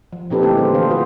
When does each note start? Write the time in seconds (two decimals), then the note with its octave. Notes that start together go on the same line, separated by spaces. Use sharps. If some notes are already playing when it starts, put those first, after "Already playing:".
0.13 F3
0.30 A#2 C4 D#4 G4 A4 B4
0.43 D3 E3 A3 E4 G4 A4
0.58 G#3 B3 D4 C5
0.74 D3 E3 G#4 C5 F5
0.90 F4 F#4 B4 C5